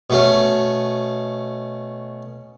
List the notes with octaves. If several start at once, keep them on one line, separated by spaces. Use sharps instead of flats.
B2 A3 C#4